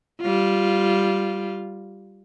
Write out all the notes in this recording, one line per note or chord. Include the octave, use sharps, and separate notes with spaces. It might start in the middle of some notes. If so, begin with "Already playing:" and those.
G3 F4